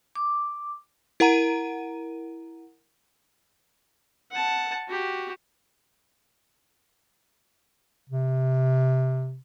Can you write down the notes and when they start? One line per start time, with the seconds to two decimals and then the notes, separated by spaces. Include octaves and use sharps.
0.15 D6
1.20 E4 A#4 F#5 A#5 D#7
4.31 F#5 A5
4.87 F#4 G4
8.10 C3